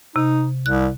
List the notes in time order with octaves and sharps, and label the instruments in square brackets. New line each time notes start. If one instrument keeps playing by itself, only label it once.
[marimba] C3 [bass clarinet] D#4
[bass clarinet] C2 [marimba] F#6